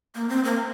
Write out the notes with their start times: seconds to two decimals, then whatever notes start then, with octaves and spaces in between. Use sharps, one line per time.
0.15 A#3
0.29 C4
0.45 A#3